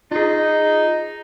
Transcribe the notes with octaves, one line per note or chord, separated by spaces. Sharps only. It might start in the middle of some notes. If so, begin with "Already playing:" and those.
D#4 F4 G#4